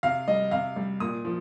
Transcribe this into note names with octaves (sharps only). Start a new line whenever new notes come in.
C3 F5
G3 D#5
C3 F5
G3
A#2 D#6
F3